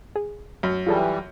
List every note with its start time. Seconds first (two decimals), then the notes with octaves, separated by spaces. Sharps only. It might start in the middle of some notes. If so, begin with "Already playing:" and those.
0.16 G#4
0.63 F#2
0.87 E3 G3 F4 G#4 A4